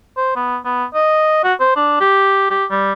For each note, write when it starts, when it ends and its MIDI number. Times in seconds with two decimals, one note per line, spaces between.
0.17 0.33 72
0.36 0.57 59
0.65 0.85 59
0.94 1.39 75
1.44 1.54 66
1.60 1.74 72
1.76 1.98 62
2.01 2.49 67
2.50 2.65 67
2.70 2.93 55